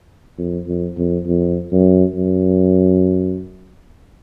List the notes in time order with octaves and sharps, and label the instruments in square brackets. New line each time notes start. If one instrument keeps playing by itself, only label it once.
[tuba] F2
F2
F2
F2
F#2
F#2